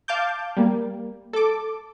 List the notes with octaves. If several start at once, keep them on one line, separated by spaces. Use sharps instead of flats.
F5 A5 D6 G6
G3 A#3
A4 D6